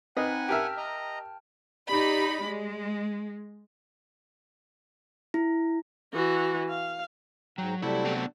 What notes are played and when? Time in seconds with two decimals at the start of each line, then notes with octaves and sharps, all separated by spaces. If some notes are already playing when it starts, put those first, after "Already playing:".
0.17 C4 D#4 B4 D#5 F#5 G#5
0.49 G4 A#4 E5 G5 A5 F6
0.77 D#5 A#5
1.89 D#4 G4 D5 B5
2.44 G#3
5.34 E4
6.13 E3 F#4
6.69 F5
7.58 G#2 F#3 G5 A#5
7.82 C3 F#3 G3 A3 E4 A4
8.05 B3 D4 G5